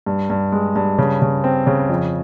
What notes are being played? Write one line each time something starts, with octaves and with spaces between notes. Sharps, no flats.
G2
G2
G#3
G2
C#3
C#3
C4
C#3
F2